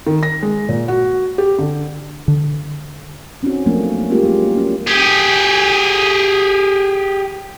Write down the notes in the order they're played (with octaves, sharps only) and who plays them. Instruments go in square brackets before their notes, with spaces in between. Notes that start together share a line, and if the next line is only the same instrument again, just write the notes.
[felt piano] D#3
A#6
G#3
A#2
F#4
G4
D3
[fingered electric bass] D3
[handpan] C4 C#4 D#4 F#4
F3 F#3 A3 A#3 C4 D4
G3 G#3 A#3 C#4 F4 G4
F#3 A#3
C#4
[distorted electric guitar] G4 G#4